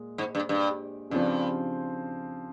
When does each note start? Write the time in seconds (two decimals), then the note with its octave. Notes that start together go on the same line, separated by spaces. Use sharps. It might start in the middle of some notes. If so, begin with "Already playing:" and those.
Already playing: A#2 G#3
0.18 G#2
0.35 G2
0.49 G2
1.10 G2 C#3 F3 C4